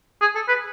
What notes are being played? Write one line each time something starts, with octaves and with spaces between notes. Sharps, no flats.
G#4
A4
B4